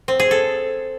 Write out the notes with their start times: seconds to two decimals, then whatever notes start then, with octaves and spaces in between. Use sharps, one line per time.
0.08 C4
0.20 G#4
0.31 A4